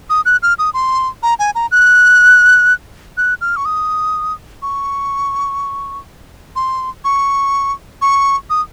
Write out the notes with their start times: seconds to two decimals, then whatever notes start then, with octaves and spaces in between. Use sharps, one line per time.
0.10 D#6
0.25 F#6
0.43 F6
0.59 D#6
0.74 C6
1.23 A#5
1.39 G#5
1.55 A#5
1.71 F#6
3.17 F#6
3.41 F6
3.57 C#6
3.65 D#6
4.62 C#6
6.56 C6
7.04 C#6
8.02 C#6
8.50 D#6